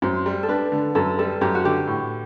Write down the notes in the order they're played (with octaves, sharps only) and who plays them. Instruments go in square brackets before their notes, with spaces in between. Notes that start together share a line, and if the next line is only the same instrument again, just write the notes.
[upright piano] F#2 [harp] C5
[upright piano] G3
[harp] A4
[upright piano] D4 [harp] B4
[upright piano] D3
[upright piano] F#2 [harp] A4
[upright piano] G3 [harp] A4
[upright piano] F#2 [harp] G4
[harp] F#4
[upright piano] D3 [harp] G4
[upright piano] A2